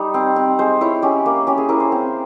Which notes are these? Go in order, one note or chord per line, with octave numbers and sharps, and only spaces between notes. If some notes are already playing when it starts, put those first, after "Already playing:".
Already playing: G3 D#4
C4
C4
G#3 C5
E4 C#5
C#4 G4
A#3
C#4 G4
G#4
E4 A#4
C5
C4